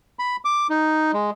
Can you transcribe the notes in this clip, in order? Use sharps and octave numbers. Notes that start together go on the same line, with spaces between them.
B5
D6
D#4
G#3